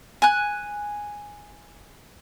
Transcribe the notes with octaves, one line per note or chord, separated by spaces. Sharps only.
G#5 F#6